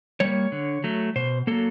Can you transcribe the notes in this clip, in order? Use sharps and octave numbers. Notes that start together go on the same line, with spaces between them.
G3 A#3 C#5
D3
F#3 A3
B2 C5
F#3 A#3 A4